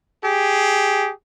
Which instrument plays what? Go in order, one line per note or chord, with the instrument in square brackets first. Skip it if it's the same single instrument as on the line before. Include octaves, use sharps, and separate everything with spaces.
[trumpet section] G4 G#4